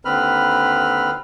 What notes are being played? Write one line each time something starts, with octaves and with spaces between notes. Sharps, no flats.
D#2 D3 C4 B4 B5 F6